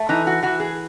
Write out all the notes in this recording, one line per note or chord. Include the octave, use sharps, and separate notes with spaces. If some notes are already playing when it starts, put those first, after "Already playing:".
Already playing: A3
E3 D#4
F#4
E3 F#4
G#4